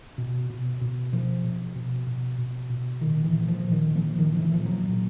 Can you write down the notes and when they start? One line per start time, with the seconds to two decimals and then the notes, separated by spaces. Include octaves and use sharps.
0.18 B2
0.50 B2
0.81 B2
1.13 B2 F3
1.44 B2
1.76 B2
2.07 B2
2.38 B2
2.70 B2
3.01 A#2 D#3
3.24 E3
3.33 A#2
3.48 F3
3.64 A#2
3.71 D#3
3.95 A#2 F3
4.19 D#3
4.26 A#2
4.34 F3
4.42 E3
4.54 A#2 F3
4.65 F#3
4.89 A#2